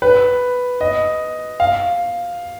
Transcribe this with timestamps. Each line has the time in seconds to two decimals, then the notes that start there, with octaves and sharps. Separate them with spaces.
0.02 B4
0.81 D#5
1.60 F5